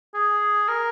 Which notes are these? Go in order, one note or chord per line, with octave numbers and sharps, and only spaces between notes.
G#4
A#4